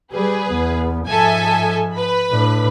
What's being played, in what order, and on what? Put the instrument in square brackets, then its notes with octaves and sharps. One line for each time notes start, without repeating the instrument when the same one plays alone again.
[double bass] G3 [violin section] G#4 B4
[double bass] E2 B3
[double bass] G#2 F3 [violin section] A4 E5 G#5
[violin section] B4 B5
[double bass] A2 D4